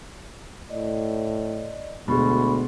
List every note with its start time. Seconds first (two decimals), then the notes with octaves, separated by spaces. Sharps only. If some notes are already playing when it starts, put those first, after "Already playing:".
0.70 A2 D5 D#5
2.08 D2 B2 G#3 B5 C#6